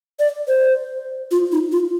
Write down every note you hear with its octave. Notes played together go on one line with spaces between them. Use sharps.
D5
C5
F4
D#4
F4